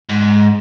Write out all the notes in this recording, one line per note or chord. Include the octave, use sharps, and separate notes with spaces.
G#2